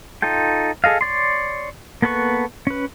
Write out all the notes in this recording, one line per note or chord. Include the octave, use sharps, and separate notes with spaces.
D#4 F4 A4 G5
G#4 A4 D#5 F5
C#5 D5 C6
A#3 B3 A4 B4 C#6
C#4 B4